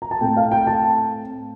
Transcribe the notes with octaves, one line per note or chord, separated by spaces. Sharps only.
A#5
A5
A2 A3 C4 G5
F5
G5
A5